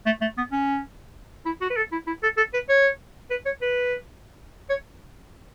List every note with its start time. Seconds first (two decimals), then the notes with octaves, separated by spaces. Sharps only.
0.06 A3
0.21 A3
0.38 B3
0.52 C#4
1.46 E4
1.61 F#4
1.70 B4
1.77 A4
1.92 E4
2.07 E4
2.23 A4
2.37 A4
2.54 B4
2.69 C#5
3.31 B4
3.46 C#5
3.62 B4
4.70 C#5